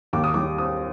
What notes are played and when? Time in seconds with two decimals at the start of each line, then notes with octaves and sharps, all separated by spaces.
0.13 D#2 D6
0.24 D#6
0.34 G3 D6
0.58 C4 D#6